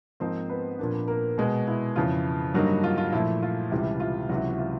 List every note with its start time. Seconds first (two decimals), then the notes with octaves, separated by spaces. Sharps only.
0.20 G#2 F3 A#3 C4 D#4 C5
0.49 B3 B4
0.79 A#2 F3 A#3 D4
1.08 A#3 A#4
1.38 B2 G#3 B3
1.67 E4
1.96 F2 C#3 E3 F4
2.54 G2 D3 F#3 G3 A#3 D#4 F#4
2.84 F4
2.98 F4
3.12 A#2 F3 A3 E4
3.42 F4
3.71 C#2 C3 E3 G3
4.00 F4
4.29 C#2 C3 E3 F#3 F#4
4.58 F4